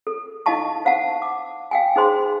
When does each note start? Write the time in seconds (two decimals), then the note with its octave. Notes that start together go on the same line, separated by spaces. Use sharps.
0.07 A4
0.46 D#4 E4 D#5 F5 A5 C#6
0.85 C5 F5 F#5 A5
1.22 D6
1.71 F5 G5 G#5
1.96 D#4 G#4 C5 C6